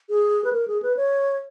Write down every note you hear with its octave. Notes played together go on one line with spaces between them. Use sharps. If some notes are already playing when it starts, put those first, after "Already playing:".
G#4
B4
A#4
G#4
B4
C#5